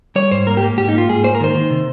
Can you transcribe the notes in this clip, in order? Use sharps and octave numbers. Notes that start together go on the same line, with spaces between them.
G3 C#5
G#2 C5
A#3 A#4
G4
A#3
G#2 G4
D#4
A#3 F4
G#2 G#4
A#3 C5
A#4
D#3 C5
D#3
C3